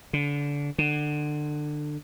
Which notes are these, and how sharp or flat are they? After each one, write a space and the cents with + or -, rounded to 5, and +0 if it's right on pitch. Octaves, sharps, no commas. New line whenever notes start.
D3 -25
D3 +25